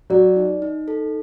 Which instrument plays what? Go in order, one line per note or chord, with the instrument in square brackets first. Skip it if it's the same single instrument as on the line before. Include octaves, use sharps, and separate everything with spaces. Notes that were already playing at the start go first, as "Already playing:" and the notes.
[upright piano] F#3 [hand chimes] D5
[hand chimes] D#4
D#4
A4